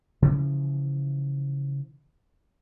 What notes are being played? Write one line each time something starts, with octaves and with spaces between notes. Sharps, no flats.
C#3 E3 F3